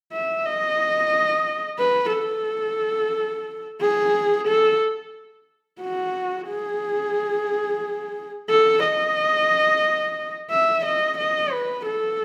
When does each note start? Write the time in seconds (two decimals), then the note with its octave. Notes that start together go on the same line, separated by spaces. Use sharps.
0.12 E5
0.45 D#5
1.79 B4
2.13 A4
3.81 G#4
4.48 A4
5.82 F#4
6.49 G#4
8.49 A4
8.83 D#5
10.50 E5
10.85 D#5
11.18 D#5
11.52 B4
11.86 A4